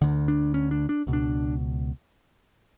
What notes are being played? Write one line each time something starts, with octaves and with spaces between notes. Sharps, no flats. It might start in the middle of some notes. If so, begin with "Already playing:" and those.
D2 D3
D4
C#4
D4
D4
C#2 B2
D4